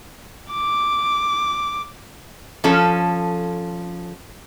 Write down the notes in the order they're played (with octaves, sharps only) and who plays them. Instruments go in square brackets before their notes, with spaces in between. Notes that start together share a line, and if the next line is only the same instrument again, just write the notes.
[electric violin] D6
[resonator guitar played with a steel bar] F3 C#4 A4